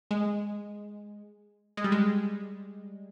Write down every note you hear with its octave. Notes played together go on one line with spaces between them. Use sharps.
G#3
G#3
G3
G#3